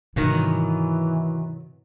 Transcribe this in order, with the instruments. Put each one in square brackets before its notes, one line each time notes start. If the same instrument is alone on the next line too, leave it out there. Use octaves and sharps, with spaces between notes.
[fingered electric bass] G#2 G3 [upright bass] C3 [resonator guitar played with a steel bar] D#3 F#3 B3 [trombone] E3